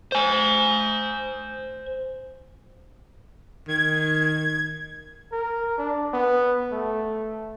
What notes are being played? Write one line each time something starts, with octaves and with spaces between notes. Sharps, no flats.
C5 G#5
D#3 G#6
A#4
D4
B3
A3